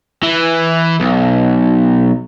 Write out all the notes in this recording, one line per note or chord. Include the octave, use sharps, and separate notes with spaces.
E3
B1